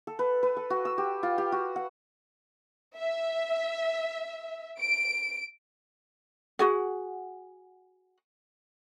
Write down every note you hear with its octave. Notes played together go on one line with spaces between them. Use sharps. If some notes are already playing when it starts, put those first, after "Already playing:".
A4
B4
B4
A4
F#4
E6
G4
F4
G4
F#4
F#5
E5
D7
F#4 G#4 F#5